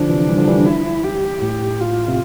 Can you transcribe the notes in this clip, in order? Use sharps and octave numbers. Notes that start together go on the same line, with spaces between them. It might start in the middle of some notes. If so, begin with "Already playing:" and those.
Already playing: D3 F3 D4
C3 E3
E3 G3
D3 F3
E3 G3
E4
G4
A2 G4
F4
C3